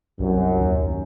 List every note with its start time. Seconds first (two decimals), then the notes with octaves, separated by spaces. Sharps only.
0.20 C2 F#2
0.60 D#2